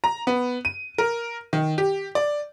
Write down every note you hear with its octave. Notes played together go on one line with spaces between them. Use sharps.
A#5
B3
D#7
A#4
D#3
G4
D5